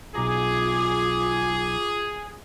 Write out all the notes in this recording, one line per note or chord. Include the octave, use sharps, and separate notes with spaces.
B1 F4 G#4 A#5 D6